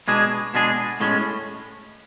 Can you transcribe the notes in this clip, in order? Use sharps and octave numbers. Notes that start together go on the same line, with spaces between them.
B2 G#3 D4 G#4
B2 G#3 D4 G#4
A2 G#3 C#4